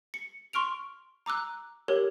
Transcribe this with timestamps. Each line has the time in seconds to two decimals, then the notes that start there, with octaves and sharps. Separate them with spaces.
0.14 C#7
0.53 C6 C#6 F6 D7 F7
1.26 A#5 D6 E6 F#6
1.88 G4 A4 A#4 C#5